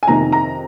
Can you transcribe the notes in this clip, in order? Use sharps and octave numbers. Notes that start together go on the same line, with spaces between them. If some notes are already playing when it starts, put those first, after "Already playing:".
G#5
F2 C3 D#3 A#5
A#5